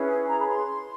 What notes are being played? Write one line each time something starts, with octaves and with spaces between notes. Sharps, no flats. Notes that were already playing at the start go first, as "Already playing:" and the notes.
Already playing: C#4 E4 G#4 B4
A#5
B5
C6